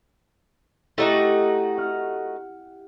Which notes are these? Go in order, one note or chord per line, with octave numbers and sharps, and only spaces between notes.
A3 D#4 E4 F#4 G4 C7
F#5 F6